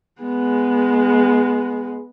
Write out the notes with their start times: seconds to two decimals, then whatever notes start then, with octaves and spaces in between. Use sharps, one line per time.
0.21 G#3 B3